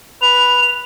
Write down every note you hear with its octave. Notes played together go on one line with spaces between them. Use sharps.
B4 F7